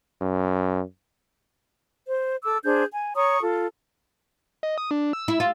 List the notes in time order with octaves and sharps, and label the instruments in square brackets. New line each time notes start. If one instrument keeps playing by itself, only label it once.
[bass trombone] F#2
[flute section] C5
A4 D6 E6
D4 G#4 C5 G6
G#5
C#5 A#5 C#6 D#6
F4 A4
[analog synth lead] D#5
D#6
D4
E6
[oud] E4
F4